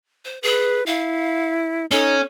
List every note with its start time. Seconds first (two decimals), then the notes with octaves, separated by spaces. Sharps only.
0.25 C5
0.43 G#4 B4
0.87 E4 F5
1.91 C#4 D#4 A4